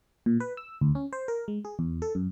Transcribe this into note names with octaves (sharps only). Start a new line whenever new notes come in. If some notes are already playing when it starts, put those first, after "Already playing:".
A#2
B4
E6
D2
C#4
C5
A#4
G#3
G#4
E2
A4
F#2